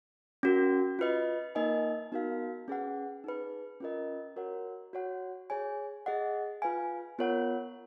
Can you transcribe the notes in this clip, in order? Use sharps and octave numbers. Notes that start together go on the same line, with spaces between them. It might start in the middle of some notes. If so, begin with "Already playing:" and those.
C#4 F#4 A#4
F4 B4 D#5
A#3 D#4 A#4 D#5 G#5
B3 D#4 F#4 A#4 F5
C#4 G#4 B4 F#5
D#4 G#4 B4
C#4 F4 A#4 D#5
F#4 A#4 C#5 F#5
F#4 C#5 F#5
G#4 C#5 G#5
G#4 D#5 F#5
F4 B4 F5 G#5
B3 F4 A#4 C#5 F#5